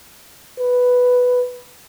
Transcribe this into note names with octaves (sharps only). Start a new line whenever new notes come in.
B4